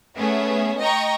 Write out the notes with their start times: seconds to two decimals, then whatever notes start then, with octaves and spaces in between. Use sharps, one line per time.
0.16 A3 B3 C#4 G#4 E5
0.78 D#5 G5 A#5 C#6